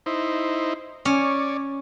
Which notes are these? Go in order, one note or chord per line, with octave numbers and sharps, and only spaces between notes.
D#4 E4 C5
C#4 C#5 D5